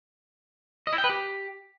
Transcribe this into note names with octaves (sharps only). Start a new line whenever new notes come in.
D#5
E4
G5
B4
G4